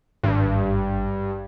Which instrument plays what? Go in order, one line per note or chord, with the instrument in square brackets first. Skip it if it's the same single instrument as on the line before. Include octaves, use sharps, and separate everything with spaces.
[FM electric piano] G#1 [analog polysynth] G2